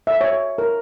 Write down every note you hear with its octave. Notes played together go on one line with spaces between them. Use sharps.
E5
C#5
A#4